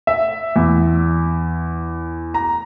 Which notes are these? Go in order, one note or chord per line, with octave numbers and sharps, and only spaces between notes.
E5
E2
A#5